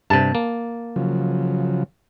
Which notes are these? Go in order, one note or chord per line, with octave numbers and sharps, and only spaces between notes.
G2 C3 A5
A#3
C#3 F3 F#3